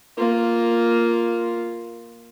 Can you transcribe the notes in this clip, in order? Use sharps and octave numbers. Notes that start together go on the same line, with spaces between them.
A#3 F4